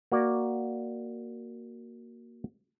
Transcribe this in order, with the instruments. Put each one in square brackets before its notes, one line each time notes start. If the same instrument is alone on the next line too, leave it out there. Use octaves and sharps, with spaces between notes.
[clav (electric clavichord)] A#3 F#4 D5